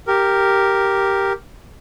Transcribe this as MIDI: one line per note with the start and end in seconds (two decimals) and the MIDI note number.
0.07 1.33 67
0.07 1.33 70